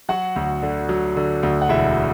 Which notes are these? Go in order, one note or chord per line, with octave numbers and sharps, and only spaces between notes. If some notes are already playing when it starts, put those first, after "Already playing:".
F#3 F#4 F#5
D2
D3
F#3
D3
D2
F#5
E1 E4 E5